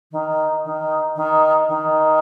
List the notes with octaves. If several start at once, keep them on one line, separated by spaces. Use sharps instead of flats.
D#3
D#3
D#3
D#3